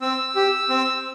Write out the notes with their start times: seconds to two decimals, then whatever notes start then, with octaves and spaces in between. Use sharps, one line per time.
0.01 C4 E6
0.36 G4
0.70 C4